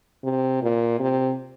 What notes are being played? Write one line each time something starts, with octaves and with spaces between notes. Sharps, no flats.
C3
A#2
C3